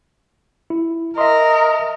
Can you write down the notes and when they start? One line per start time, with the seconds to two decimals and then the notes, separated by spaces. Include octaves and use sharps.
0.70 E4
1.18 A#4 D#5 E5 C6